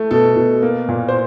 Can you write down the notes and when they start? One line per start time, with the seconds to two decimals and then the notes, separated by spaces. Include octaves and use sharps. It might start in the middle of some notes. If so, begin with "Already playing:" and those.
Already playing: A3
0.11 B2 A4
0.36 B2
0.62 A#3
0.89 A#2
1.08 C5